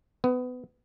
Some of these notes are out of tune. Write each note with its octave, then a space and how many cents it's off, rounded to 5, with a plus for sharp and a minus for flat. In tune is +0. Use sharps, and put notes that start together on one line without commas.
B3 +25